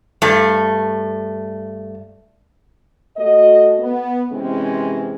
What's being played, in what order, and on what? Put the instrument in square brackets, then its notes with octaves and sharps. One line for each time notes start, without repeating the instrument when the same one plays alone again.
[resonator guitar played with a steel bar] G2 A3
[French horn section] A3 F#4 D#5
B3
C3 E3 G#3 C4 C#4